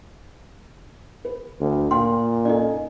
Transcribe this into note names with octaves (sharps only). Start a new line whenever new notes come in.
B4
D2
A#2 F4 F5 G5 C6
C#4 D#4 A4 D5 D#5